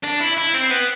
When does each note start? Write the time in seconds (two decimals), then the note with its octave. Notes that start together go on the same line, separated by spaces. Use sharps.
0.03 D4
0.20 E4
0.37 E4
0.53 C4
0.70 B3